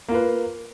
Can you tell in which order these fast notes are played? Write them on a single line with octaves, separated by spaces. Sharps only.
A#3 F4 B4